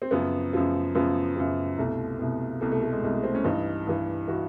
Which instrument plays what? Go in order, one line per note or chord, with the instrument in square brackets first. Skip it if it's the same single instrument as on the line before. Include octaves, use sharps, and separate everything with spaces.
[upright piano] C4
F#2 C#3 F3 B3
F#2 C#3 F3
F#2 C#3 F3 B3
F#2 C#3 F3
C2 B2 A3
C2 B2
C2 B2 A3
A3
A3
G#3
C2 B2 G#3
A3
C4
C#4
G2 E3 D#4
G2 E3
E3 F#4